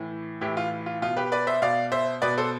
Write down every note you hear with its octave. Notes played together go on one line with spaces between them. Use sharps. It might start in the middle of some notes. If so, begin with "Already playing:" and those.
Already playing: A2 E3
A2 E3 E4 G4
F4
F4
B2 F4
G4 B4
B4 D5
C5 E5
B2 D5 F5
C5 E5
B2 B4 D5
A4 C5